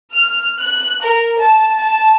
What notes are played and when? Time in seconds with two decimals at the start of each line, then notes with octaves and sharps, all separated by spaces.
0.14 F6
0.59 F#6
1.02 A#4
1.40 A5
1.79 A5